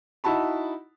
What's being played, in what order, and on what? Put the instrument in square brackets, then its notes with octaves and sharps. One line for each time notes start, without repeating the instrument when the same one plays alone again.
[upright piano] D#4 E4 F#4 A5 B5